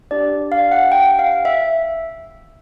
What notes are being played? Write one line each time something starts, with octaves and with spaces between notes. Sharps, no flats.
D4 G4 D5
F5
F#5
G5
F5
E5